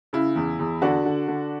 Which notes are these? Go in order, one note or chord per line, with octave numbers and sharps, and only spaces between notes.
C#3 E4
E2
E2
D3 D4 F#4
D3
D3